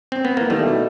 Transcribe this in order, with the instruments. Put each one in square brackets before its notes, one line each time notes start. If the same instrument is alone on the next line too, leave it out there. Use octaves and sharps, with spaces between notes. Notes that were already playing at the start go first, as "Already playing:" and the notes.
[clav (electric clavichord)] C4
B3
[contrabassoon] E3 [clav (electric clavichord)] A#3
[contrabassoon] D#3 [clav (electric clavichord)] G3 A3
[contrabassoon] B2